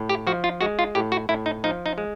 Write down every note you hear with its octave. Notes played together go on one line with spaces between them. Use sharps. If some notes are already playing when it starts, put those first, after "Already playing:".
Already playing: A2
G4
F3 F#4
F4
G#3 F#4
F4
A2 G4
F#4
A2 E4
D#4
F3 D#4
D#4
G#3